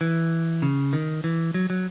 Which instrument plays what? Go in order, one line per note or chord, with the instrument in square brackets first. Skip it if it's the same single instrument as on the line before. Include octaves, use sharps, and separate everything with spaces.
[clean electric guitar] E3
C#3
D#3
E3
F#3
F#3